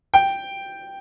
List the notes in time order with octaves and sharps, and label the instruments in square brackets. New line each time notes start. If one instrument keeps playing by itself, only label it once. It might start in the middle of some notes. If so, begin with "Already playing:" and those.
[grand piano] G5